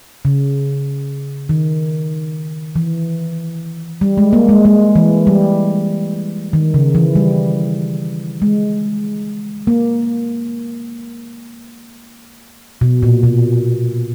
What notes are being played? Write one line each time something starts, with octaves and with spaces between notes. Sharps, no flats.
C#3
D#3
E3
G3
G#3
A#3
G#3
G#3
E3
G3
D#3
C#3
E3
G3
G#3
A#3
B2
A#2
B2